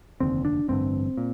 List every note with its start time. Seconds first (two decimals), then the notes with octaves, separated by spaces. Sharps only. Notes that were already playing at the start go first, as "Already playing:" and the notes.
0.20 F1 D#2 D3 C4
0.45 D4
0.68 A1 G2 D3 C4
1.17 A#2